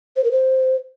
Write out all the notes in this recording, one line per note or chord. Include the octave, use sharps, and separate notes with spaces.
C5
A#4
C5